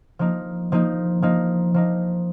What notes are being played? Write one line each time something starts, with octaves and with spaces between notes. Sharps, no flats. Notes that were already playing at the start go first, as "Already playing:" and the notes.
F3 A#3 D#4
F3 A#3 D#4
F3 A#3 D#4
F3 A#3 D#4